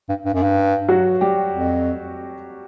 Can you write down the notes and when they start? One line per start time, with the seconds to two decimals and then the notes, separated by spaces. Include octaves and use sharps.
0.09 G2
0.25 G2
0.34 F#2
0.43 G2
0.88 F#3 F#4
1.21 G3 G4
1.53 F2